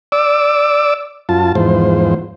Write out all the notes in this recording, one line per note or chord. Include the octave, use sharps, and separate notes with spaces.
D5 D6 E6
F#2 F4 A5
E2 G#2 F3 C5